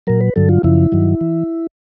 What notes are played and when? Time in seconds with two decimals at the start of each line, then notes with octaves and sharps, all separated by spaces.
0.07 A#2 F#3 A#4
0.21 B4
0.36 G2 D3 F#3 A4
0.49 F4
0.63 F#2 C#3 F3 E4
0.92 G2 D#3 F#3
1.21 E3